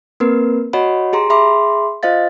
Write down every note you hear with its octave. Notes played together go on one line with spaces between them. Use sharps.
A#3 C4 A#4 B4
F#4 C#5 D#5 F#5 B5
G4 G#4 A#5 C6
G#4 E5 B5 C6 D6
F4 C5 D#5 F5 A6